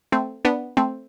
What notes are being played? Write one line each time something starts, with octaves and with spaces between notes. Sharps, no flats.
A3 C4
B3 D4
A3 C4